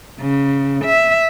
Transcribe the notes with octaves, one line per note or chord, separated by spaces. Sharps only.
C#3
E5